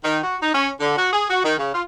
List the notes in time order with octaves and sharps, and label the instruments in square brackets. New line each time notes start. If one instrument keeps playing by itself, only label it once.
[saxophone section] D#3
F#4
D#4
C#4
D3
F#4
G#4
F#4
D#3
C#3
F4